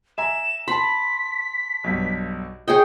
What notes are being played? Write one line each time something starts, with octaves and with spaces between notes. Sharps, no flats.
E5 G#5 A#5 E7
A5 B5 C6 B6
B1 G2
G#4 C#5 D#5 G5 D#6